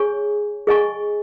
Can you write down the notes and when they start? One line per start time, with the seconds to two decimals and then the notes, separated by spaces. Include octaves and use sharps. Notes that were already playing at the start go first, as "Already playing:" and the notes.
Already playing: G#4 C#5 G#5 C#6
0.67 G#4 D#5 G#5 C#6